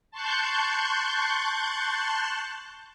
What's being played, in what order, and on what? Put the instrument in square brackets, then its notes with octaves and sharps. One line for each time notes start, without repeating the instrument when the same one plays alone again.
[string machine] A5 C6 C#6 F#6 G6